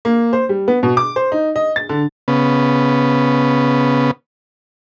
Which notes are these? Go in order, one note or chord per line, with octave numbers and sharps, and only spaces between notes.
A#3
C5
G3
B3
B2
D6
C5
D#4
D#5
A6
D3
C#3 B3